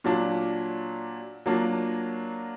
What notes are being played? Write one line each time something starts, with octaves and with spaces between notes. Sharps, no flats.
A#2 F#3 D4
F#3 A#3 D4 F4